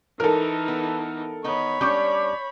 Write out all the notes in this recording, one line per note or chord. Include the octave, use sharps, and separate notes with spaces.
E3 D#4 A4 A#4
B3
D#3 B3 D#4 C#5 B5
G3 C#4 D4 C#6 D6 G6